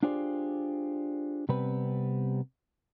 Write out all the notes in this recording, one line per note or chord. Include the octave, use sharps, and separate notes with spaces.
D4 F4 G4 G#4 C5 D5
C3 G3 B3 C4 B4